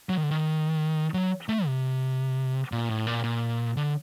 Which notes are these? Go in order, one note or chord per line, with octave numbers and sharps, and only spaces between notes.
F#3
D#3
D3
D#3
F#3
A3
C3
A#2
A2
A#2
A#2
D3